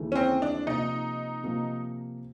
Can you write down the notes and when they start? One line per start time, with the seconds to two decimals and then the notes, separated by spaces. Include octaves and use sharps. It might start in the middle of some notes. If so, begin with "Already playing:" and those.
Already playing: D#2 C#3 E3 A3
0.12 C#4
0.15 C4
0.42 D4
0.67 C3 F3 A#3 D#4
1.44 C3 F3 A#3